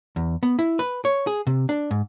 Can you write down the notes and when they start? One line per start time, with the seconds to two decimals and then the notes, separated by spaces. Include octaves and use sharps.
0.16 E2
0.43 B3
0.59 E4
0.79 B4
1.05 C#5
1.27 G#4
1.47 C3
1.69 D4
1.91 G#2